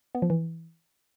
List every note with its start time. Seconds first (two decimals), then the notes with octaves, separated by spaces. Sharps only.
0.15 B3
0.22 F3
0.30 E3